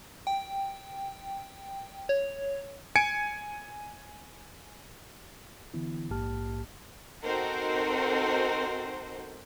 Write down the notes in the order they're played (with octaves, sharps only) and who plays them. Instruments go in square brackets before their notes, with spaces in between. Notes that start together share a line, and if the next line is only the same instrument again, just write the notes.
[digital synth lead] G5
C#5
[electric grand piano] G#5 G#6 C#7 D7
[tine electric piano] D3 E3 B3 E4
A#1 G#2 A#3 G4 A5 F6
[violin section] C4 D#4 F#4 A4 A#4 C5